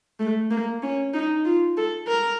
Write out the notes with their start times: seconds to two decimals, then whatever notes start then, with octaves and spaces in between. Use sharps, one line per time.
0.20 A3
0.51 A#3
0.82 C#4
1.14 D#4
1.45 F4
1.77 A4
2.08 A#4